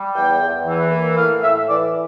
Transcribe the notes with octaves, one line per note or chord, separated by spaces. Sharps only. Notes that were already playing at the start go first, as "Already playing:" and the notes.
Already playing: G3
E2 G5
E2
E3
A#3
A2 F5
A2 E5
E3 D5